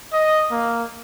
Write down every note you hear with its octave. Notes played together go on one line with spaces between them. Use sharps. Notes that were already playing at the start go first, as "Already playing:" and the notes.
D#5
A#3